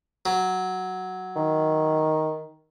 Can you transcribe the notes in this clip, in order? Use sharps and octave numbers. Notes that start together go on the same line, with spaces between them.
F#3
D#3